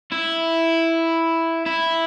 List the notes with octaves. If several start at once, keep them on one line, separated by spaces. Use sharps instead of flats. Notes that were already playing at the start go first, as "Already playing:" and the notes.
E4
E4